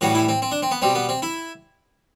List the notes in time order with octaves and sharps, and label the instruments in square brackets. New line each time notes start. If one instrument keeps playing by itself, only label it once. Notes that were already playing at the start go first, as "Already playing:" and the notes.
[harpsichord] A2 E3 G3 F#4
E4
C4
C4
D4
C4
B3
B2 G3 C4
B3
C4
E4